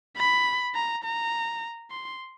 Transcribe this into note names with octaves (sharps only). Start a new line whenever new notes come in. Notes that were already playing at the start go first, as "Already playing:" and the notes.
B5
A#5
A#5
C6